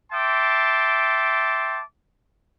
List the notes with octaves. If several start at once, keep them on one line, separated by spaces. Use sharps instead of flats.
E5 G5 A5 C6 D6